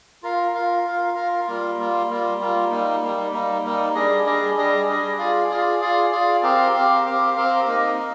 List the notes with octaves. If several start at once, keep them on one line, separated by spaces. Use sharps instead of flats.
F4 A#4 F5
F4 A#4 F5
F4 A#4 F5
F4 A#4 F5
G3 A#3 F4
G3 A#3 F4
G3 A#3 F4
G3 A#3 F4
G3 A#3 D#4
G3 A#3 D#4
G3 A#3 D#4
G3 A#3 D#4
G3 D4 G#4 D#5
G3 D4 G#4 D#5
G3 D4 G#4 D#5
G3 D4 G#4 D#5
F4 G#4 D5 F5
F4 G#4 D5 F5
F4 G#4 D5 F5
F4 G#4 D5 F5
C4 G4 A#4 F5
C4 G4 A#4 F5
C4 G4 A#4 F5
C4 G4 A#4 F5
A#3 D#4 A#4 D#5
A#3 D#4